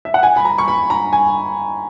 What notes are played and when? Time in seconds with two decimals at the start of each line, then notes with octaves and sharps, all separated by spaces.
0.05 E5
0.14 F#5
0.23 G#5
0.36 B5
0.45 A#5
0.58 C#6
0.68 B5
0.90 A#5
1.13 G#5